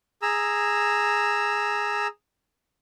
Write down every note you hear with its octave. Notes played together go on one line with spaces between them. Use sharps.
G#4 A#5 E6